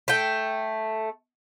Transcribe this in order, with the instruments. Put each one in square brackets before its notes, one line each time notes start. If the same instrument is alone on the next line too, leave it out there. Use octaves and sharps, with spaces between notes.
[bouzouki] A3 G5